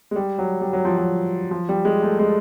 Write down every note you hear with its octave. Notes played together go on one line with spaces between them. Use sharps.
G#3
G3
F#3
G3
F#3
F3
F#3
F3
G3
G#3
A3
G#3